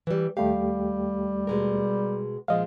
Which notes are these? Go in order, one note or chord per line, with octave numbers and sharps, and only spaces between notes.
E3 G3
D#2 G3 A3 G4 F5
B2 G#3 A#4
A#2 F3 G#3 D#5 F5